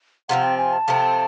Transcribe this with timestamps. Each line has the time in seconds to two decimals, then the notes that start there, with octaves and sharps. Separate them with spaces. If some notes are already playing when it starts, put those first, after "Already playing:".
0.29 C3 F3 A3 C4 F#5
0.43 G5
0.58 G#5
0.73 A5
0.88 C3 F3 A3 C4